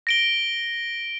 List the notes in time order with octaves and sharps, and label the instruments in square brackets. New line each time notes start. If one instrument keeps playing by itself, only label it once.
[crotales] A#6 D7 G7